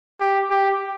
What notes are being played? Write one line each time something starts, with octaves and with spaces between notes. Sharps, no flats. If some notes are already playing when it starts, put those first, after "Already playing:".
G4
G4